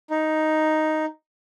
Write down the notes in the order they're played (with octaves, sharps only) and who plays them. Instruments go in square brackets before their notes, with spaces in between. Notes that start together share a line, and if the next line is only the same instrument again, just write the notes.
[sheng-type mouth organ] D#4